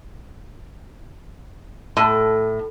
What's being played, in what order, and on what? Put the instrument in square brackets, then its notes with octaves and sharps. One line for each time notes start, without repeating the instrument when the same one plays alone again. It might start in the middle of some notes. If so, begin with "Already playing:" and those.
[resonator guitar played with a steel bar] A2 [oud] A4